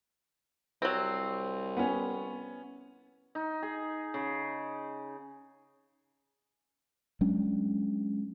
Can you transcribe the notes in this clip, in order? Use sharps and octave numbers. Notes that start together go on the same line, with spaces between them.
C2 F#3 C4
B3 C#4
D#4
G#4
C#3
F#3 G#3 C#4 D4